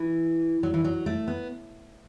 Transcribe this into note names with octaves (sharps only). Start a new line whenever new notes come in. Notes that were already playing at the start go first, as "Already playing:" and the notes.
Already playing: E3
F#3
E3
F#3
A3
B3